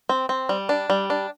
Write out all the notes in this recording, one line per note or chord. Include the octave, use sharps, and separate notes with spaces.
C4
C4
G3
D4
G3
D4